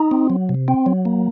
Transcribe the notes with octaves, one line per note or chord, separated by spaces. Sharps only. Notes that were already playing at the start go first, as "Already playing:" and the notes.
Already playing: D#4
C4
F#3
C3
C4
F#3
A#3